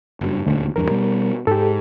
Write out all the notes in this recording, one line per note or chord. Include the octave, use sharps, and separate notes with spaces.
F#1 G2
D#1 D2
D#1 E2 G2 A#4
B2 G3
G#2 G4 A4